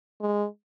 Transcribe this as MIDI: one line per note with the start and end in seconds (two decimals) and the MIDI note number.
0.21 0.46 56